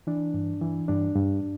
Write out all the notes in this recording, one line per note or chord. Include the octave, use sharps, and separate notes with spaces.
E3 D4
G2
E3
G2 D4
G2